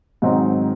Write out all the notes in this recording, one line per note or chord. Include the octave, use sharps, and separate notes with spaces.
G#2 D#3 F#3 C4 D#4